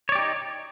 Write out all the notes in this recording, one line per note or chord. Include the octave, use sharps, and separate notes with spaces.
D#4 G4 C#5 D5